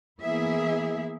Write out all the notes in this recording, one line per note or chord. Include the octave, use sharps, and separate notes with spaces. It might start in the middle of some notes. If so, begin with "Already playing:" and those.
E3 A#3 B3 E4 G#4 E5